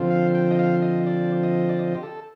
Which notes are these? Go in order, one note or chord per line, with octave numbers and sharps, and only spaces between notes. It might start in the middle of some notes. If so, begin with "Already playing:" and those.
Already playing: D3 F3 C4 F4
F5
G5
D#5
F5
D#5
D5
D#5
D5
D#5
G4
A4